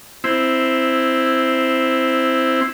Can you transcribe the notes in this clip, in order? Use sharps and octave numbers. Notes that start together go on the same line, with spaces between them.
C4 E4